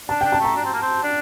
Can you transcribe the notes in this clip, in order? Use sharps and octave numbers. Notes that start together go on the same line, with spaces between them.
D4 A5
G5
D4
A5
A3 A#5
D4
C4
A#3
C4
D4